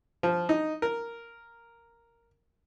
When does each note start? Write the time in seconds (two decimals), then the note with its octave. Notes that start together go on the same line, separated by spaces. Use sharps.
0.23 F3
0.49 D#4
0.82 A#4